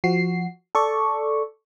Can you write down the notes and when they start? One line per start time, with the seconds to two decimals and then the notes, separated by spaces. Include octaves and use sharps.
0.04 F3 F#4 C7
0.75 A4 D5 C#6